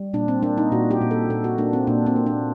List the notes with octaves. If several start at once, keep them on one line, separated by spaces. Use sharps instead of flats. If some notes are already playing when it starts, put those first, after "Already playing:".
Already playing: G3
A#2 D4
C4
A#3 D4
D#4
A#2 F#4
G4
A#2
A4
A#2 A4
F#4
A#3 D4
C4
A#2 D4
C4
A#3
D4